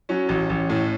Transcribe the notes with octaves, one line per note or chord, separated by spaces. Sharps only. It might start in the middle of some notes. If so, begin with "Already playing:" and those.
F#3 C#4
A1
A1
A2